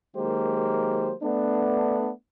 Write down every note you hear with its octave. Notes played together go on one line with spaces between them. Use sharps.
D#3 F#3 G#3 A#3 G4 C5
A3 B3 D4